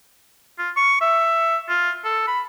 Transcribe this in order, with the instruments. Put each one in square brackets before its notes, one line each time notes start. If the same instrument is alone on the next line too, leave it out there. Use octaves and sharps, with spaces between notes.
[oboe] F4
C#6
E5
F4
A4
B5